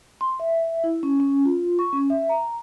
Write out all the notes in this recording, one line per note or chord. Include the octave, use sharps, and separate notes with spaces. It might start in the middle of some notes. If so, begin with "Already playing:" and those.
C6
E5
E4
C#4
C#4
F4
C#6
C#4
E5
A#5